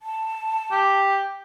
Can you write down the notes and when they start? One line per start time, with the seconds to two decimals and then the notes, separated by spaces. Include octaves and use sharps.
0.02 A5
0.72 G4